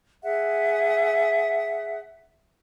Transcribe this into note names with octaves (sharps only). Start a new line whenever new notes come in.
G#4 E5 F#5